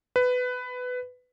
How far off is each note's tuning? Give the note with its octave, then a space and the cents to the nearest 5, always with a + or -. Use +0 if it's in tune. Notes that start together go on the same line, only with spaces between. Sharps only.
B4 +15